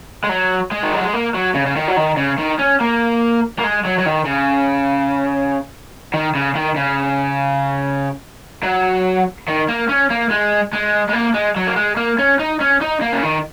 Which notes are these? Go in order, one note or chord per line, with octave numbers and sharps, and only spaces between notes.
G#3
F#3
G#3
D#3
F#3
G#3
A#3
F#3
C#3
C#3
D#3
F#3
D#3
C#3
D#3
C#4
A#3
A#3
G#3
F#3
F#3
D#3
C#3
D#3
C#3
D#3
C#3
F#3
D#3
A#3
C#4
A#3
G#3
G#3
G#3
A#3
G#3
F#3
A#3
G#3
A#3
C#4
D#4
C#4
D#4
A#3
C#3
D#3